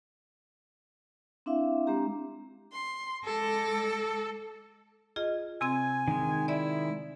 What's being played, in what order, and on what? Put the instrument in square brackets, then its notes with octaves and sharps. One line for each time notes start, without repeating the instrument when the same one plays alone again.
[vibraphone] C4 D4 E4 E5 F5
G#3 C4 D4 G4 A#5
[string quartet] C6
[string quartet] G#3 D6 A#6 [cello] A4
[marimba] F4 G#4 D#5
[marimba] C3 C4 G#6 [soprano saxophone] G#5
[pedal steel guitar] D#3 G#3
[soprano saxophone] E4 [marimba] D5 E5